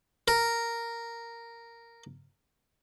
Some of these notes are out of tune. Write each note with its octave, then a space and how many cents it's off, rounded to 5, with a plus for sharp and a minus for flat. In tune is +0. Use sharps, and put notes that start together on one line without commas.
A#4 -5